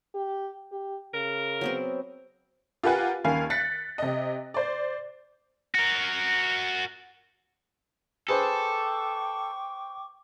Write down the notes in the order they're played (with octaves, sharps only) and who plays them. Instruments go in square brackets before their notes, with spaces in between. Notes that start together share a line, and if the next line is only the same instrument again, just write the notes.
[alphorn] G4
G4
[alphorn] C#3 [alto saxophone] A#4
[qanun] F#3 B3 C4
[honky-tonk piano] F4 G4 A#4 B4 F#5 G#5
D#2 A#3 C#4 F5 G#5 B5
F#6 A6 B6 C#7
C3 D#5
C5 D5
[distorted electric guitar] F#4 A#4
[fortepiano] G#4 B4 C5 [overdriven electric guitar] A4 [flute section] G5 C#6 D6